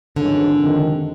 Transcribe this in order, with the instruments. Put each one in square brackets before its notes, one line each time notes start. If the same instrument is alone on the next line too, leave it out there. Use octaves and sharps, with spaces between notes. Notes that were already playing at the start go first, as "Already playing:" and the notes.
[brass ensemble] G#1 G2 E3 G#3 C#4 [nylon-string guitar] D3
[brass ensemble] F2 C3 D#3